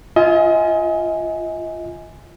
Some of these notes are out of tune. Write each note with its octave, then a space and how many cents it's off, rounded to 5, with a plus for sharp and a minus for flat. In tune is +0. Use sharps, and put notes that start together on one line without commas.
F4 -15 D#5 +35 G#5 +0